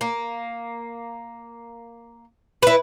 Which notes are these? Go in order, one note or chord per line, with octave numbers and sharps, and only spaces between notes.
A#3
E4 B4